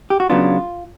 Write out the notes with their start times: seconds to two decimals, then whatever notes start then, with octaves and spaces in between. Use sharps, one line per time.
0.10 G4
0.20 F#4
0.29 C#3 F#3 B3 D4 F4